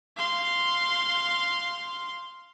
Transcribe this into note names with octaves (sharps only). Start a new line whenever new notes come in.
F5 C6